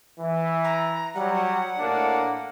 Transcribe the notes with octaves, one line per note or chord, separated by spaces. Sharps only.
E3
A#5
F#3 G3 F#5
A2 A#3 D4